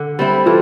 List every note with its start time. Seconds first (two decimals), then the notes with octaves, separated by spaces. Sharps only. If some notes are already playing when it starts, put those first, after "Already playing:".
Already playing: D3
0.19 G3 C4 E4
0.46 E3 F4 A4